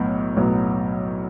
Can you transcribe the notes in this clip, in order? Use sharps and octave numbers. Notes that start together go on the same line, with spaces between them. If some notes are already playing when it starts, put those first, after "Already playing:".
Already playing: B1 A2 F#3 B3
B1 A2 F#3 B3